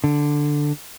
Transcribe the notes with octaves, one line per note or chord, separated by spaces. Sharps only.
D3